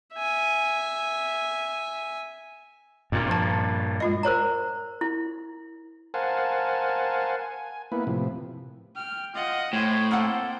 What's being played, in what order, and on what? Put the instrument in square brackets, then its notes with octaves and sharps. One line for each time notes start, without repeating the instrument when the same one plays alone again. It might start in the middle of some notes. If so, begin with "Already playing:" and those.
[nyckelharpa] E5 G#5
[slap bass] G2 A#2
[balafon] F3 A5
G#3 F4 D#5
[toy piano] A#4 C5 C#5 A#5
E4
[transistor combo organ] A#4 C5 F5 F#5 G#5 A5
G#5
A#3 B3 E4 B4
A2 C3 F3
[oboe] G5 [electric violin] F6
[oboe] F4 [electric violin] D#5 F#5
[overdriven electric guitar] A2 [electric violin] C5 G5 [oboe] G#5
[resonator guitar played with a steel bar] A#3 C4 F#5 [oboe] A4